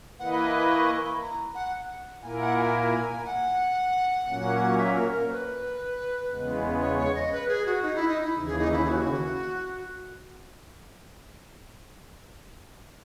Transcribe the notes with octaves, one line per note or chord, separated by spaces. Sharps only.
E3 A#3 E4 B4 D#5 F#5
B5
B5
C#6
C#6
B5
A#5
F#5
A#2 A#3 E4 A#4 G#5
F#5
G#5
F#5
A#2 F#3 A#3 C#4
E5
A#4
A#4
C#5
B4
E2 C#3 G#3 B3
C#5
C#5
D#5
B4
G#4
F#4
D#4
E4
D#4
E4
D#2 C#3 E3
G#4
D#4
E4
G#4
F#4